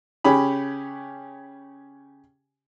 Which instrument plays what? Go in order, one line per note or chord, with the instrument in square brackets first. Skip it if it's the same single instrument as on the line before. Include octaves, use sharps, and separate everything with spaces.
[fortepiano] C#3 C#4 G4 B5